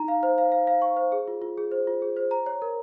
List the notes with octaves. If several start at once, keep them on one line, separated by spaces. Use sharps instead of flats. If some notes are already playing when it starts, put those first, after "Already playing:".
Already playing: D#4 A#5
F5
C5
F5
F5
F5
C#6
C5
G#4
F4
F4
G#4
C5
F4
G#4
C5
A#5
C#5
A#4